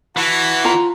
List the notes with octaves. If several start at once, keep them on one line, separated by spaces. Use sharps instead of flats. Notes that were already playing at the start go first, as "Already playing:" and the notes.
E3 F#4 F#5 A5
F4 A#5